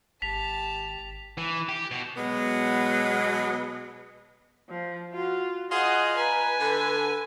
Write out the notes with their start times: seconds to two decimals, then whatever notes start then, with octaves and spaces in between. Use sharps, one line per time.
0.22 G#1 G4 A5 B6 F7
1.38 E3
1.69 G4
1.91 B2
2.16 B2 F#3 G#3 B3
4.69 F3
5.14 F4 F#4
5.71 F4 G#4 D#5 F#5
6.17 B4 G#5 A#5
6.60 D3 A4